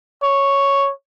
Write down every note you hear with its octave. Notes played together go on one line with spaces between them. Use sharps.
C#5